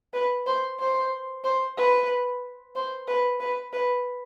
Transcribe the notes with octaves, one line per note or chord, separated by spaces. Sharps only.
B4
C5
C5
C5
B4
C5
B4
B4
B4